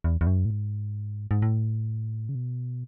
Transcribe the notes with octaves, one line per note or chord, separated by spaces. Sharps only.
E2
E2
F#2
A2
G#2
G#2
A2
C#3
B2